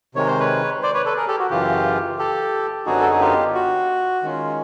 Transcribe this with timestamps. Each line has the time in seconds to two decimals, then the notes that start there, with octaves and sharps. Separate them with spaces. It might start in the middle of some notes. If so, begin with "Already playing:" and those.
0.15 C3 D#3 G#3 C#5
0.27 C5
0.39 B4 C#5
0.82 C5 D5
0.94 B4 C#5
1.05 A4 B4
1.17 G#4 A#4
1.28 G4 A4
1.39 F#4
1.51 F#2 C#3 E3 F4 G4
2.19 G4 A4
2.86 F#2 D3 F#3 B3 D#4 F#4 G#4
3.01 A4
3.11 G#4
3.20 F4 G4
3.55 F#4
4.23 D#3 G#3 C#4 F4